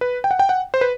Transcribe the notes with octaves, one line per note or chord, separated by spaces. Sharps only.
B4
G5
F#5
G5
F#5
C5
B4